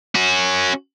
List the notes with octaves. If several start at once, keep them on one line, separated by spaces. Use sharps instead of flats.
C#4 F#4